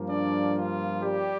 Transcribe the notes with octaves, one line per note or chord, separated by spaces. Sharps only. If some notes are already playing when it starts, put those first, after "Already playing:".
Already playing: G2 F3 A#3
D4 D5
F4
G3 G4